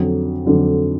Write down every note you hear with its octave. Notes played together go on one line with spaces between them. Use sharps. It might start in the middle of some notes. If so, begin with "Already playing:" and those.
Already playing: F2 D3 F#3
F2 D3 F#3